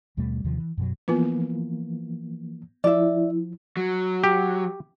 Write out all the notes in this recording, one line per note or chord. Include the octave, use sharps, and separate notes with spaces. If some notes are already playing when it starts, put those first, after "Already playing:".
D#2 B2 G3 A3
D#2 C3 D#3 F3
E3
F#2 B2 F#3
E3 F3 A#3 B3 F4 B4
F3 E4 D5 E5
F#3
G4